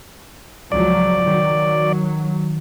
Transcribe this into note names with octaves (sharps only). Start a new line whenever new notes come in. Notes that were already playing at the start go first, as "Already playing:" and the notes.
C#2 F3 F#3 D5
D#3 F#3